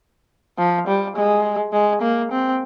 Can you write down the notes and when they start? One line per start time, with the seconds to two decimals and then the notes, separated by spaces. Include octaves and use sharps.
0.58 F3
0.88 G3
1.17 G#3
1.73 G#3
2.02 A#3
2.32 C4